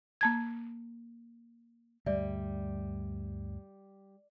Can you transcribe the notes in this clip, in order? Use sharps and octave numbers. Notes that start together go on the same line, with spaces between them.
A#3 A5 G#6
D2 G2 G3 D5 E5